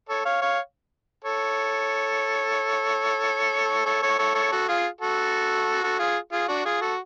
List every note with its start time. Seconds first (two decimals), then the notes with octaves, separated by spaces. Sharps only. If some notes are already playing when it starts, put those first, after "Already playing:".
0.09 A4 C#5
0.25 C#5 F5
0.42 C#5 F5
1.24 A4 C#5
3.86 A4 C#5
4.02 A4 C#5
4.19 A4 C#5
4.35 A4 C#5
4.52 F#4 A4
4.68 F4 G#4
5.01 F#4 A4
5.84 F#4 A4
5.99 F4 G#4
6.32 F4 G#4
6.48 D4 F#4
6.65 F4 G#4
6.81 F#4 A4